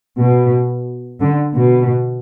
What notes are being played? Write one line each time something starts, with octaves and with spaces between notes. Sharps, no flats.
B2
D3
B2